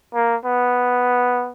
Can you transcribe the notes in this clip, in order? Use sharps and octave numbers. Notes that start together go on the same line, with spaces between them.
A#3
B3